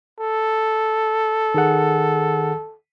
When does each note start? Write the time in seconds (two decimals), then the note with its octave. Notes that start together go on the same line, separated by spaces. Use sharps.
0.20 A4
1.54 D#3 G#4 F#5